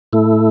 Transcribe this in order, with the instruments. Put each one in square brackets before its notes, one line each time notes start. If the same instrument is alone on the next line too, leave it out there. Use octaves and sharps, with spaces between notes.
[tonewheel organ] A2 A3 E4